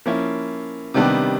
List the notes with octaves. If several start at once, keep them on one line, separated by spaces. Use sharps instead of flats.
F3 A#3 C#4 E4
C3 D#3 G3 B3 D4